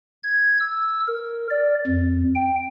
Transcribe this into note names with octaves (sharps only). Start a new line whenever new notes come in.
G#6
E6
A#4
D5
F2
G5